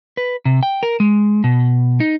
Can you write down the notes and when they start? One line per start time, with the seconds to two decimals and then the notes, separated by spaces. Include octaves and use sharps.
0.17 B4
0.45 C3
0.63 G5
0.83 A#4
1.00 G#3
1.44 B2
2.00 D#4